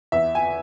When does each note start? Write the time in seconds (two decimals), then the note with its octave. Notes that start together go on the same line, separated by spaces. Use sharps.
0.12 E2 E5
0.35 G#5